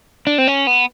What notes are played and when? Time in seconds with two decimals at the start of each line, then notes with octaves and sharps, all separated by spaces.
0.27 D4
0.38 C4
0.47 C#4
0.67 B3